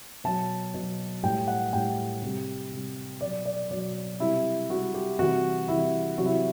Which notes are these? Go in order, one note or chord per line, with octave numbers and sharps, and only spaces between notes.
B2 F#3 A5
B2 F#3
A2 G3 G5
F#5
A2 G3 G5
C3 G3
C3 G3
B2 F#3 D5
D5
B2 F#3 D5
C3 G3 E4
C3 G3 F#4
G4
C3 E3 G3 F#4
C3 E3 G3 E4
C3 F#3 F#4
E4